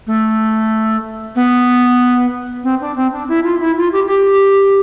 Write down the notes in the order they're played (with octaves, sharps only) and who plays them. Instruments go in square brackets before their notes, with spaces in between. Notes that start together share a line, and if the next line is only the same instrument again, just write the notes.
[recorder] A3
B3
C4
D4
C4
D4
E4
F4
E4
F4
G4
G4